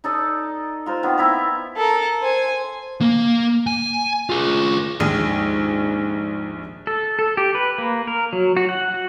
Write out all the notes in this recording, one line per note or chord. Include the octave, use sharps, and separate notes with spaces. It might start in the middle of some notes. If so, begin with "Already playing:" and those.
D#4 A4 D5 D#5
F4 A#4 C5
D#3 B3 C4
B3 E4 E5 A#5
A4 A#4
C5 G#5
A#3
G#5
F4 G#4
A#1 D#2 G#2 G#4 D#7
A4
A4
G4
B4
A#3
A#4
F#3
F#4
F#5
F#4